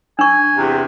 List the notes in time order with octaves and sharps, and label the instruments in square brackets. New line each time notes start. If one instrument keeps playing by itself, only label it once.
[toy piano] D4 C#6 [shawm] G#5
[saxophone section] E2 C3